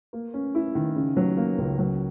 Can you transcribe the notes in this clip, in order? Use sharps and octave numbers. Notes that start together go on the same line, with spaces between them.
A#3
C#4
E4
D#3
C#3
F#3
A#3
C#2
F#3